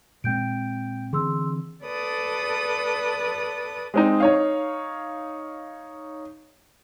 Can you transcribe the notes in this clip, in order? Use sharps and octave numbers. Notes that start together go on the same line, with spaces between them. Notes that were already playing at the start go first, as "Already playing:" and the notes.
A#2 G#3 C4 G5 G6 D7
D3 E3 C4 G#4 C6 E6
A4 B4 D5 D#6
G#3 C4 D#4
D#4 C#5 F5